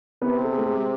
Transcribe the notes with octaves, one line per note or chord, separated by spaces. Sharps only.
C3 B3 B4
A4
G#4
A3 A4
G#3 G#4